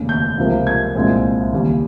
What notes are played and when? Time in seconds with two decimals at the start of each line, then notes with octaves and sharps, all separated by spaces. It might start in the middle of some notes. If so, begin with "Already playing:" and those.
Already playing: F1 D#2 C#3
0.09 G6
0.38 C#2 C3 F3 A#3
0.67 G#6
0.95 C2 A#2 G#3 C4
1.53 D#2 C#3 G3